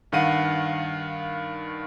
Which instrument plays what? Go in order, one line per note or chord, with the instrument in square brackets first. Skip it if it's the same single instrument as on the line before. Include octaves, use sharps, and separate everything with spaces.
[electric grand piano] G2 D#3 F5 F#5 D#7